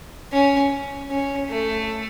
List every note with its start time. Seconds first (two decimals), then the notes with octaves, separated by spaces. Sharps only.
0.31 C#4
1.09 C#4
1.48 A3